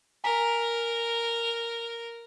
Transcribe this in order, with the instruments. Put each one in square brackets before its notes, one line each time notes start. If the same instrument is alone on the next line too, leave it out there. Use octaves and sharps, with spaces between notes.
[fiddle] A#4 [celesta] G#5 A#5 B6